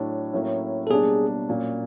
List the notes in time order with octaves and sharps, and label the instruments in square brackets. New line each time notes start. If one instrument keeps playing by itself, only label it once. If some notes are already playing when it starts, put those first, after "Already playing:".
Already playing: [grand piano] A2 F#3 A3 D4
A2 F#3 A#3 C#4 E4
[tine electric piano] A4
[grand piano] B2 G3 A#3 D4 [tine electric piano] G#4
[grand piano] A#2 F#3 A#3 C#4